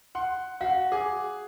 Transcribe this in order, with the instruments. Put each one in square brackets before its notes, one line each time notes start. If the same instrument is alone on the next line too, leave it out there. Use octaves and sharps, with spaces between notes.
[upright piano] F#5 C6
[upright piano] F#4 [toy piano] F5 F#5
[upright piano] G#4 [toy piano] D6